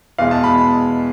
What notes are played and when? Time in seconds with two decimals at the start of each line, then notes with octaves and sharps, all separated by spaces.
0.18 E2 B2 G#3 F5
0.31 A5
0.44 B5